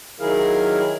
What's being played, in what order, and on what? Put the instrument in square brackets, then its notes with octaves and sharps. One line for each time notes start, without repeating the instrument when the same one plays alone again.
[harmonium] D#3 F#3 E4 G#4 A#4 F5